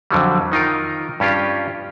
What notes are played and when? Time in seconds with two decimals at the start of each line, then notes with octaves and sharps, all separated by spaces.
0.11 F2 D3 F#3 G3
0.52 D#3 D#4 F4 A#4
1.20 G2 C#4 F4 G4